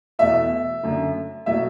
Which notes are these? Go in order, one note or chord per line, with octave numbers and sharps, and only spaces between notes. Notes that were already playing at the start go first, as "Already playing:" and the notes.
E2 B2 A3 E5
F#2 D3 A3
B2 F#3 A3 E5